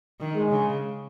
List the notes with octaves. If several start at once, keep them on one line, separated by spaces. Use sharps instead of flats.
D#3
G#3
C#3